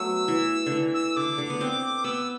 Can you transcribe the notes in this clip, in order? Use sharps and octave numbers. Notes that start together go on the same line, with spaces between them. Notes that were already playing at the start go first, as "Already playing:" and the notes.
Already playing: F#3 A3 B3 E6
E3
D3
E3
E6
D3 D6
D3
B3
C4
B3 E6